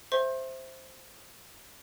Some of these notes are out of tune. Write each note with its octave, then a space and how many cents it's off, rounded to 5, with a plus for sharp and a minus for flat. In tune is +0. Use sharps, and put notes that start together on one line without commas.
C5 +0 E5 +0 C6 +40